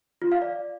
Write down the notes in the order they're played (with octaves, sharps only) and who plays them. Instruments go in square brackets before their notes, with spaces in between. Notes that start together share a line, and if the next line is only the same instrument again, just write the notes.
[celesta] F4
F5
D5